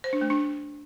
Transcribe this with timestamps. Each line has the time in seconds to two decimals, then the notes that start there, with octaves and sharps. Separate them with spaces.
0.04 C5
0.13 D4
0.21 A3
0.30 D4